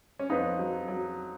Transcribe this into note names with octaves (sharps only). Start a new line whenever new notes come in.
C#4
F2 B3 D#4
F#3
F#3